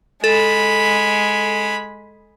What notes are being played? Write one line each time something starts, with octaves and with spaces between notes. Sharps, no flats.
G#3 A4 B5